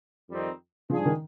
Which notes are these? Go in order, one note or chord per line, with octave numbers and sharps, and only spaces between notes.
F2 D#3 G3 C4 D#4
G#2 F3 G3 D4 F4 G#4
D#3